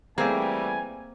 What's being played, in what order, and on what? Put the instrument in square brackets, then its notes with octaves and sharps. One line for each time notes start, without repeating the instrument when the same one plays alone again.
[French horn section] E3 G3 A3 [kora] A#3 E5 [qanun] C4 G#4 [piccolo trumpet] G#5